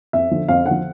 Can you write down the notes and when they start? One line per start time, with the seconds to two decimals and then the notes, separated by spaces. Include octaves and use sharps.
0.13 F2 E5
0.31 D3 F3
0.48 F2 F5
0.65 D3 F#5
0.71 F3